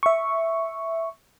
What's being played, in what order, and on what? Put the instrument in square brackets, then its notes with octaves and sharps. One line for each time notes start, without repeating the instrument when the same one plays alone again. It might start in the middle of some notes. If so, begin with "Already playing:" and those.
[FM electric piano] E5 C#6